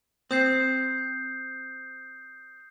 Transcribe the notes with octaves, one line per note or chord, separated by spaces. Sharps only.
C4 D#6 G6 C7